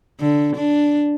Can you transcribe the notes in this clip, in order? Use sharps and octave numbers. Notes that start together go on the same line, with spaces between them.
D3
D4